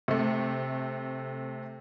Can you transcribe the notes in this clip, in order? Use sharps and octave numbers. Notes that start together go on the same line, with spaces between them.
C3 A3